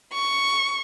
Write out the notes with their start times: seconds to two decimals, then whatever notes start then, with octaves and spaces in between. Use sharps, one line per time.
0.13 C#6